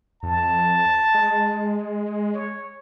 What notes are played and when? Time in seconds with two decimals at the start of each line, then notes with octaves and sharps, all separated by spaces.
0.23 F2 A5
1.14 G#3
2.34 C#5